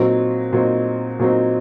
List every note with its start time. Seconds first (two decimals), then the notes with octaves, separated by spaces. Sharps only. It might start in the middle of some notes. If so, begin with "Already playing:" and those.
Already playing: A#2 F#3 C4 D#4
0.53 A#2 F#3 C4 D#4
1.19 A#2 F#3 C4 D#4